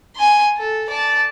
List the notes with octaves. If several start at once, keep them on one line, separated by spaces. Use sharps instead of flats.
G#5 C6
A4
D5 A5